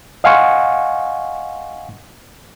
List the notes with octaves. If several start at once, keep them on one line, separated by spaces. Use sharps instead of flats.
D#5 F5 F#5 G#5 C6 C#6